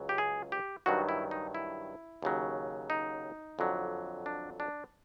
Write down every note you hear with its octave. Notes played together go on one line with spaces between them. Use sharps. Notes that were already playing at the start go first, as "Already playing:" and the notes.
Already playing: C#2 C#3 F#3
G4
G#4
G4
G2 D#3 F#3 F#4
E4
D#4
E4
D#2 C#3 F#3
D#4
F2 D3 F#3
D4
D4